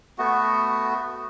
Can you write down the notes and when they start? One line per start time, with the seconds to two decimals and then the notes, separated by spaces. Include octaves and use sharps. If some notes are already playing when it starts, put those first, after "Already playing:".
0.18 A3 B3 F#4